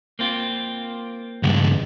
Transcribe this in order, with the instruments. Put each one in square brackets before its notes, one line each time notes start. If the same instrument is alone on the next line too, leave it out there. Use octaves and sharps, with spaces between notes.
[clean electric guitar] A#3 C4 F4
[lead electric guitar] C#2 G2 [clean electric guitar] G#3